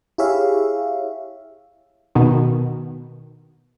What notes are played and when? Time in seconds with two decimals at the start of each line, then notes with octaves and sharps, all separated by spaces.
0.18 E4 G4 G#4 C#5 E5 F5
2.15 B2 D#3